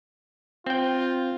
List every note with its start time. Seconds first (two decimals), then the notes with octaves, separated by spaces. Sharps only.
0.66 C4 F4 G5